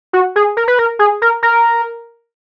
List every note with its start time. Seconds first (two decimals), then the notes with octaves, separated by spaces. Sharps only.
0.13 F#4
0.36 G#4
0.57 A#4
0.68 B4
0.79 A#4
0.99 G#4
1.22 A#4
1.43 A#4